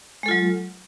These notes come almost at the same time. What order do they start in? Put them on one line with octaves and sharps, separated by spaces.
G#3 A4 F4 F#3